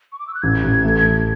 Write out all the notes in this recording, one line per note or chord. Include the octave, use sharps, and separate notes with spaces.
C#6
D6
E6
F#6
A1 G#6
A1
A3
A1